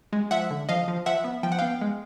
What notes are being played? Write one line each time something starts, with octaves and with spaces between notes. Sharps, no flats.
G#3
F3 E5 F#5
D3
F3 D#5 F5
F3
F3 E5 F#5
B3
F3 G5
F#5
B3 F5 G5
G#3